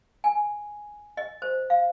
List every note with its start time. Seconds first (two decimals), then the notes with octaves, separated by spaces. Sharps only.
0.24 G#5
1.17 D#5
1.42 C5
1.70 F5